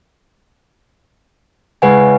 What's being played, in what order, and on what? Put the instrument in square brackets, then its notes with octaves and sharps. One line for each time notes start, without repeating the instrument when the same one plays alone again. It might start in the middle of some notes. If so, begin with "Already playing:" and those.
[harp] C#3 G#3 E4 [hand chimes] B4 F#5 G#5